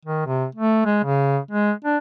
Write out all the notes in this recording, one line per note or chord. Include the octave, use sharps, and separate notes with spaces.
D#3
C3
A3
G#3
C#3
G#3
D4